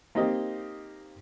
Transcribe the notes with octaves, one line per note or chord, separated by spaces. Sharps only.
A#3 C4 D#4 G4 D#5